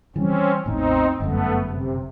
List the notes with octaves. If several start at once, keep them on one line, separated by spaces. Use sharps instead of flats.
E3 G3 C4 C#4
A1 E2 C4 D#4
G1 F#2 A3 B3
C3